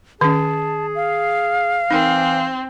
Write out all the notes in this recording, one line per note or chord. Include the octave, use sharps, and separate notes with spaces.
D#3 C#4 G#4 A5
F5
E3 C4 D#4 A#4